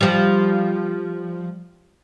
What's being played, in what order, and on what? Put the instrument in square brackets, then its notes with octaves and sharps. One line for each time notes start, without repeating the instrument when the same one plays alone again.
[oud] F3 G3